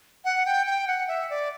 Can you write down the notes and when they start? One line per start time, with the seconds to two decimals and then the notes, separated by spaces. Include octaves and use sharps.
0.25 F#5
0.46 G5
0.67 G5
0.87 F#5
1.08 E5
1.30 D5